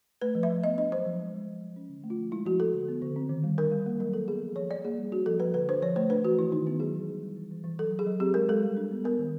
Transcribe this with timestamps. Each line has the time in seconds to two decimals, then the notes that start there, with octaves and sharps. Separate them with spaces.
0.22 A3 B4
0.35 F3
0.43 E5
0.50 F3
0.64 B3 D#5
0.78 D4 D#5
0.92 F#3 C5
1.06 F3
1.19 G#3
1.34 G#3
1.48 F3
1.62 F3
1.76 C#4
1.89 D3
2.04 A3
2.10 F4
2.18 F3
2.32 G#3 E4
2.45 F3 F#4
2.59 F3 A4
2.73 D3
2.88 B3
3.02 D3
3.16 C4
3.29 D#3
3.44 G3
3.58 D4 A#4
3.71 G3
3.86 A#3
4.00 F#3 A#4
4.13 F#3 A4
4.28 B3 G#4
4.42 F3
4.56 F3 C#5
4.70 F3 D5
4.85 A#3 G#4
4.98 G3
5.12 D4 F#4
5.26 F3 A4
5.40 F3 B4
5.54 D3 B4
5.69 D4 C5
5.82 F3 C#5
5.96 A3 C5
6.10 D4 B4
6.24 E3 F#4
6.39 E3 E4
6.52 D#3 D#4
6.67 B3 E4
6.80 F#3 G#4
6.94 E3
7.09 G3
7.23 G3
7.37 E3
7.51 E3
7.64 E3
7.79 F#3 A4
7.92 F#3
7.99 G#4
8.06 F#3
8.20 C4 G4
8.34 G#3 A#4
8.49 G#3 A4
8.63 G3
8.77 D4
8.91 B3
9.04 B3 A#4
9.19 D#3